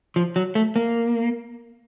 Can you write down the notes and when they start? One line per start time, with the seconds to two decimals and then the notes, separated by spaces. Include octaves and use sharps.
0.16 F3
0.36 F#3
0.55 A3
0.76 A#3